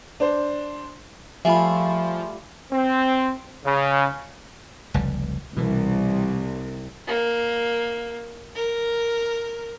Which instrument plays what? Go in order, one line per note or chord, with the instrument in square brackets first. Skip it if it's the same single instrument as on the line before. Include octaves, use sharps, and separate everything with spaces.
[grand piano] D4 C5
[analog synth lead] F3 [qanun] G3 A3 F4 [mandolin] G#4 [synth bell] E5 B5
[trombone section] C4
C#3
[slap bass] F1 C#2 G3
[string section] C2 [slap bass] B2 E3
[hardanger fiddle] A#3
A#4